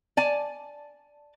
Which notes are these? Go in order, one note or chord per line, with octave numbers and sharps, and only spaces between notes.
D5 G#5 A5